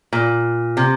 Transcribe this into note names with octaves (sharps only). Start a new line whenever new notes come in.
A#2
C3